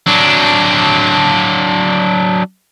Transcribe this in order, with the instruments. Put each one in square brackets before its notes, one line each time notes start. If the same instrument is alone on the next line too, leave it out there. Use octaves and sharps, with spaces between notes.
[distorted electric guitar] F#3 D4